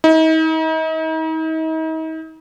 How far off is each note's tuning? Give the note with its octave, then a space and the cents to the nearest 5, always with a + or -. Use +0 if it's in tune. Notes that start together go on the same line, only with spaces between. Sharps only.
D#4 +40